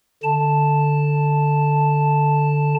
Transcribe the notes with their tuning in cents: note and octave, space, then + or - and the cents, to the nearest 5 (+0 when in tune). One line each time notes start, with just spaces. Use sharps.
D3 +0 A5 +0